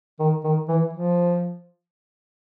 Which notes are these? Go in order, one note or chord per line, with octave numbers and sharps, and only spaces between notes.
D#3
D#3
E3
F3